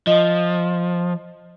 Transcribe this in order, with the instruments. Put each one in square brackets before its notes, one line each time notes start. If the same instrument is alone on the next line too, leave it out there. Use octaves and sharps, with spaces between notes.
[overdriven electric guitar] F3 [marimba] D#5